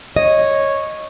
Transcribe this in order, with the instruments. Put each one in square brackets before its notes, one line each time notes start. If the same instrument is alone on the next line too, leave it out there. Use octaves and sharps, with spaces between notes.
[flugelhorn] C#5 [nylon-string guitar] D#5